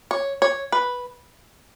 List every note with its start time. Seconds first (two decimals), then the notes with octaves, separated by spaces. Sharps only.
0.11 C#5
0.42 C#5
0.72 B4